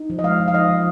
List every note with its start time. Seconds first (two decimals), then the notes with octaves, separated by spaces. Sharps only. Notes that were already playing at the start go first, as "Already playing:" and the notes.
Already playing: D#4
0.10 F3
0.19 D#5
0.24 G#3 F5
0.40 F3
0.48 F5
0.54 D#4 D#5
0.69 F3